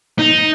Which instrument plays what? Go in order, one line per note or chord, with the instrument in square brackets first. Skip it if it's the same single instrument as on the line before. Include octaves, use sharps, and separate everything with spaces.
[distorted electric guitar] D#4